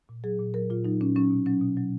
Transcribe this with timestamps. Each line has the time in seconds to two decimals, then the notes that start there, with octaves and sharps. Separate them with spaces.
0.09 A#2
0.24 F#3 G#4
0.39 A#2
0.54 F#3 A#4
0.70 A#2 F4
0.85 F#3 D#4
1.01 A#2 C#4
1.16 F#3 C#4
1.30 B2
1.46 F#3 C#4
1.61 B2
1.77 F#3